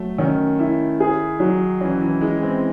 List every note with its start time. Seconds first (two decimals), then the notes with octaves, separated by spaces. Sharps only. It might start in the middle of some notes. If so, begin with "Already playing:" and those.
Already playing: F#3 A3
0.18 D#3 C#4
0.59 E4
1.00 G#4
1.40 F#3
1.81 E3 C#4
2.01 E3
2.21 G#3 E4
2.42 C4